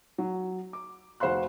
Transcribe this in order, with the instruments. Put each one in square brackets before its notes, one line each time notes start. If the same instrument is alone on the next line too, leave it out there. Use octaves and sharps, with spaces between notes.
[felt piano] F#3
D6
F1 F#4 C5 F5 C6 F#6